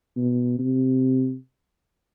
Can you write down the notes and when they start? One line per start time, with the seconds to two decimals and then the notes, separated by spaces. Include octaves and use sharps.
0.17 B2
0.59 C3